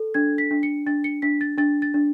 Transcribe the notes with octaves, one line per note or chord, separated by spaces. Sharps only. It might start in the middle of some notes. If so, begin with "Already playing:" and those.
Already playing: A4
D4 G#6
B6
D4
C#7
D4 A6
C#7
D4 B6
A6
D4 A6
A6
D4